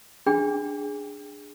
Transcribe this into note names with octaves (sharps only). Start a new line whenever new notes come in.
D4 G#4 G5